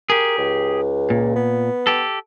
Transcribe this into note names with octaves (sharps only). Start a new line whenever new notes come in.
G4 G#4 A#4
C#2
A#2
B3
G4 A4